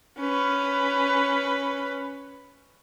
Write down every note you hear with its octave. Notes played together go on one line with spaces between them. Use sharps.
C#4 B4